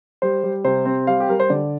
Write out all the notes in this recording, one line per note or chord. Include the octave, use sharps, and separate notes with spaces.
G3 C5
G3
C3 C5
C4
G3 F5
G4
G3 A#4
C5
D3 D5